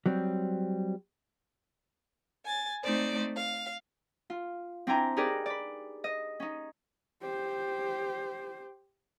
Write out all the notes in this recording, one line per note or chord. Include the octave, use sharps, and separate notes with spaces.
F#3 G3 C4
G#5 A6
A3 C4 D#4 C5 D5
F5
F4
C4 D4 E4 G5 G#5 A#5
D#4 G4 G#4 A#4 B4 D5
D5 B5
D#5
C#4 D#4
G4 C5